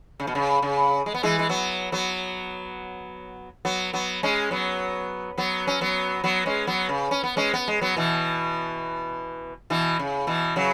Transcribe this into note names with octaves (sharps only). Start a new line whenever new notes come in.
C#3
B2
C#3
C#3
G#3
B3
E3 G#3
G#3
F#3 B3
F#3 B3
F#3 B3
F#3 B3
G#3 C#4
F#3 B3
F#3 B3
C#4
F#3 B3
F#3 B3
G#3 C#4
F#3 B3
C#3
C#4
B3
G#3 C#4
B3
G#3
F#3 B3
B2 E3
B2 E3
C#3
B2 E3
C#3 F#3